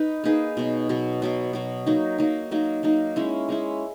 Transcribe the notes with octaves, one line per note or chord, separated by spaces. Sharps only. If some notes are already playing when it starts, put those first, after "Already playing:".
Already playing: D#4 B4
A#3 D#4 G#4 B4
B2 F#3 B3
B2 F#3 B3
B2 F#3 B3
B2 F#3 B3
F#3 A#3 D#4
F#3 A#3 D#4
F#3 A#3 D#4
F#3 A#3 D#4
G#3 C#4 E4
G#3 C#4 E4